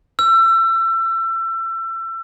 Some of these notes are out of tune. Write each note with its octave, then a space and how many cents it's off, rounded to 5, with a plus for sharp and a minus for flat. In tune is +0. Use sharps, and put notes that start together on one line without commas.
E6 +30